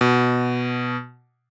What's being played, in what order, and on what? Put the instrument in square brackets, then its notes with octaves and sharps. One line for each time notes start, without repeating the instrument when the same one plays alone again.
[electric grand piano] B2